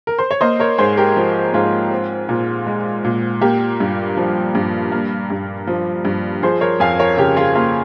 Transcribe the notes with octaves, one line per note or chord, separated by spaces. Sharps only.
A#4
C5
C#5
A#3 C5 D#5
A#4 C#5
G#2 G#4 C5
G4 A#4
F3
G#2 F4 G#4
C4
A#2
G#3
A#2
A#3 G4
G2
F3
G2
A#3
G2
F3
G2
F3 G#4 C5
A#4 C#5
F2 F5 G#5
A#4 C#5
C#3 G4 A#4
F4 G#4
A#3 F4